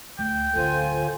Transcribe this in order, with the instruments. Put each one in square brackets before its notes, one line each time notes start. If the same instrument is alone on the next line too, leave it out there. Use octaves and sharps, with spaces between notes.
[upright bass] D2 [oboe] G5
[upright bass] D1 C#4 [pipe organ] D3 C5 [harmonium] F4 G#5